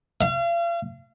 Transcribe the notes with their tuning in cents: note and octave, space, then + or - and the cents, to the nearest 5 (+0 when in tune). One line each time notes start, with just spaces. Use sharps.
F5 -40